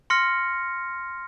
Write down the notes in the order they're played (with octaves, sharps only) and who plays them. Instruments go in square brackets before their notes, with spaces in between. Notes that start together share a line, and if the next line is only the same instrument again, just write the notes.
[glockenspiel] C6 F6 A#6 C#7